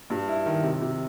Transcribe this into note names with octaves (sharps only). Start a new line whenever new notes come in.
G2
E4
D#3
C3
C3